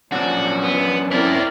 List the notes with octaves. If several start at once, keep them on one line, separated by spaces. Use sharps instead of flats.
F#2 A#2 F3 D4 F#4
B3
C4 E4 A#4 C#5 D5 E5